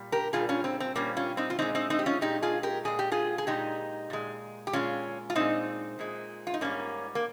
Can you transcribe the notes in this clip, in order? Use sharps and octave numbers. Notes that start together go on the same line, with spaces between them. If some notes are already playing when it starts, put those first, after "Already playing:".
Already playing: A#2 G3
G4 A#4
A#2 G3 F4 G#4
C#4 F4
C4
C4
A#2 G3 A#3 C#4
C#4 F4
C4 D#4
F4
A#2 G#3 C4 D#4
C4 D#4
C4 D#4
G4
C#4 F4
A#2 G#3 D#4 G4
F4 G#4
G4 A#4
A#2 G#3 G#4
G4
F4 G#4
G#4
A#2 G#3 D#4 G4
A#2 G#3
G4
A#2 G#3 C#4 F4
F4
A#2 G#3 C4 D#4
A#2 G#3
F4
D#4
G#2 G3 A#3 C#4
A#3